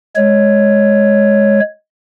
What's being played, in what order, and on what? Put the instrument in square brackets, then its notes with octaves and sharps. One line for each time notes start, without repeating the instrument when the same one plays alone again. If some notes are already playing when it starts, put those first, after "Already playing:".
[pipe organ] G#3 C#5